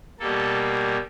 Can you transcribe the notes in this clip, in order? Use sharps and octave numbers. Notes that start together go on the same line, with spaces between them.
B2 G3 A#3 A4